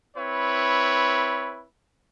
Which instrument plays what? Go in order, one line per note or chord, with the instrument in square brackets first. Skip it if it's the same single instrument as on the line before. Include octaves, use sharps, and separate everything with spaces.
[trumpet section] C4 E4 B4 C#5